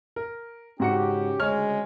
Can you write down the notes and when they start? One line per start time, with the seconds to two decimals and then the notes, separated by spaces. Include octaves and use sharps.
0.16 A#4
0.80 G#2 C#3 C#4 F#4 G4 C#7
1.39 D2 C#3 G#3 C#5 F6